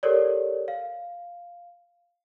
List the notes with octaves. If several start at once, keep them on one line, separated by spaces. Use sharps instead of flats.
G4 A4 A#4 C#5 D5
F5